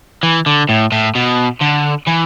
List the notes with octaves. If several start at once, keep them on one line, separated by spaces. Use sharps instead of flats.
E3
D3
A2
A2
B2
D3
E3